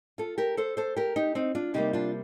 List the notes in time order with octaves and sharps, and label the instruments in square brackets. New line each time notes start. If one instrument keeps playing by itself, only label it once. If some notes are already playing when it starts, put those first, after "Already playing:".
[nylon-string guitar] F4 A4
G4 A#4
A4 C5
A4 C5
G4 A#4
D#4 G4
C4 D#4
D4 F4
C3 G3 A#3 D#4 G4
D4 F4